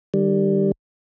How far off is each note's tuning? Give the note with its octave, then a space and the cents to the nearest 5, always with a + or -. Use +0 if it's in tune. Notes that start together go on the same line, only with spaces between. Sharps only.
D#3 -40 G3 +0